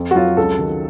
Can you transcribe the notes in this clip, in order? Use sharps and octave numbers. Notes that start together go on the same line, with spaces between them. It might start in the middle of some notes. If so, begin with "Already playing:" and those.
Already playing: F2
F#4
F#3 F4
C#2 A4
D#3